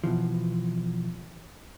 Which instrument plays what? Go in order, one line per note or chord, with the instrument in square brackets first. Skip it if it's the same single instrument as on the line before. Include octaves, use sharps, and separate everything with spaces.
[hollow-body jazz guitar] B2 E3 F3